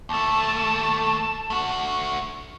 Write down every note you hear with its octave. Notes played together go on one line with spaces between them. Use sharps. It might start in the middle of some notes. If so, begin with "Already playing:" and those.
D#2 A3 A5
A3 F#4